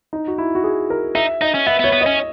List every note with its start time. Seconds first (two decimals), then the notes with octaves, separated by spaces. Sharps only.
0.13 D#4
0.28 F#4
0.38 E4
0.55 F#4
0.64 G#4
0.90 A#4
1.15 D#4 E5
1.41 D#4 D#5
1.54 C#4
1.67 B3 E5
1.79 B3
1.84 C#5
1.93 B3
2.01 D#5
2.06 C#4